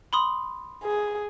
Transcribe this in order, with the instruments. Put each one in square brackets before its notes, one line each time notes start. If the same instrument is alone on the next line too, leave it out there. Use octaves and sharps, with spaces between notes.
[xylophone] B5 C6 D#6
[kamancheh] G#4